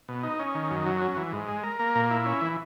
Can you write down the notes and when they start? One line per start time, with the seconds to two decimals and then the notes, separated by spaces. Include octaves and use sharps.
0.09 B2
0.23 D#4
0.39 C#4
0.55 D#3
0.71 F#2
0.86 F#3
1.02 C#4
1.17 E3
1.33 G#2
1.48 G#3
1.64 A#4
1.79 A#3
1.95 A#2
2.11 E4
2.26 C#4
2.41 E3